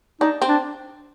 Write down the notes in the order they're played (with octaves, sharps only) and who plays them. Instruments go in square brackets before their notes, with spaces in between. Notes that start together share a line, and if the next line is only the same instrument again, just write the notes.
[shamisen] D4 [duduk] D#4
[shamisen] C4
[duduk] D4